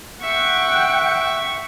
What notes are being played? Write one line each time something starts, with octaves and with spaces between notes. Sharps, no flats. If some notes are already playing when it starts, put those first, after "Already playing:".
E5 F#5 G5 C#6